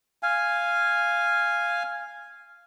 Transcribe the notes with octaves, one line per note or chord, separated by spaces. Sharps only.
F5 G#5